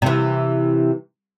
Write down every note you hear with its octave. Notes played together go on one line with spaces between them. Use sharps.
C3 E3